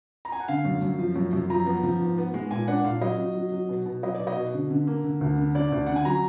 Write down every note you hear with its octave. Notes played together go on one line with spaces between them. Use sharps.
A#5
G#5
F#5
D3 F5
F#2
F#2
F3
F#2
F#2
F3 A#5
B3
F3
G#2
B3
G#3
A#2 G#5
D4 F#5
A#2 F5
F#3 D#5
F#3
F#3
F#3
B2
B2
F#3 D#5
D5
B2
D#5
B2
D3
D3
A#3
D3
D2
D3
D3 D5
D2
D3 F#5
G#5
F#3 A#5